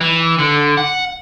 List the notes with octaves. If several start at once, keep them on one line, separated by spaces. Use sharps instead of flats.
E3
D3
F#5